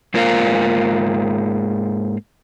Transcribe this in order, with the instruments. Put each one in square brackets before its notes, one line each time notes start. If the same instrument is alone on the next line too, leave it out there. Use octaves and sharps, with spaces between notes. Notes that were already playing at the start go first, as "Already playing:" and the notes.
[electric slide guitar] G#2 A#3 F4 A#4 C5 F5